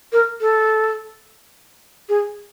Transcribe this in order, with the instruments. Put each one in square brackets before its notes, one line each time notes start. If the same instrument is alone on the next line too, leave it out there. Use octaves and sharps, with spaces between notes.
[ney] A#4
A4
G#4